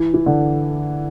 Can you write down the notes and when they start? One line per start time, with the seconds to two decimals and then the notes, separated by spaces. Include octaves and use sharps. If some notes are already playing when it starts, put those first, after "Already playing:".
Already playing: E3
0.14 E3
0.26 D3